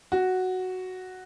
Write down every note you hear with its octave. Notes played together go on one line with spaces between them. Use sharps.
F#4